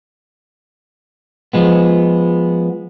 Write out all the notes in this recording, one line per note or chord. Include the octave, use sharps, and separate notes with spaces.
F3 G#3 B3